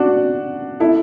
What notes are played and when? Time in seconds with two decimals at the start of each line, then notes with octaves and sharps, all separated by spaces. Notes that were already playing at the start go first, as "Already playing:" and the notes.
Already playing: D4 F#4
0.80 E4 A4